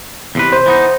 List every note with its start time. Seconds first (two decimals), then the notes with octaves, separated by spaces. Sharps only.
0.35 E2 C3 B4
0.53 C5
0.66 E3 B3 D#4